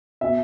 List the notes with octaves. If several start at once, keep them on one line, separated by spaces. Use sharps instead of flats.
B2 E5